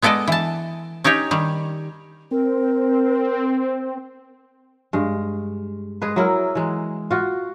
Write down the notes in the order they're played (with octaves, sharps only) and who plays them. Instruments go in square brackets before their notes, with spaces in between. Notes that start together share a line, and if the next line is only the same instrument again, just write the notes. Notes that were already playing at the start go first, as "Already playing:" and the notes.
[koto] G#3 B3 A4 D5 D#5
E3 A5
C#4 D#4 G4 C#5
D#3 G3
[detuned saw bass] C4 [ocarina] A#4
[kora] G2 G#3
G#3 G#4 B4
F#3 E4 A#4
E3 G#3
F4 F#4